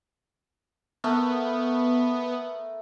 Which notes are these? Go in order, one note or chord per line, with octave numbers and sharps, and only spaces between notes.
A3 B3 A#4